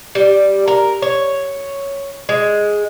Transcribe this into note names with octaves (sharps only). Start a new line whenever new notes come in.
G3
A#4
C#5
G#3